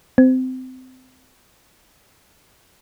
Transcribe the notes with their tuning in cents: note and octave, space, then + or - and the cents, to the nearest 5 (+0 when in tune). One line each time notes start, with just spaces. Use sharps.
C4 -25